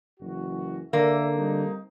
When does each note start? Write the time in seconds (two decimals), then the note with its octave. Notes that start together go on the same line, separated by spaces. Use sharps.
0.20 F#1 E3 F#4
0.93 D3 A#3 A#4 D5 E5
1.36 G3 C4 D#4